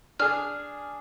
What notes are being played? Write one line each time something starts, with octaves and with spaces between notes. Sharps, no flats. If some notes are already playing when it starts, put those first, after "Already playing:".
D4 G#4 F6